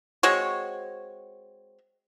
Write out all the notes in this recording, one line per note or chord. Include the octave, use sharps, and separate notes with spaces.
G#3 C4 F#4 C#5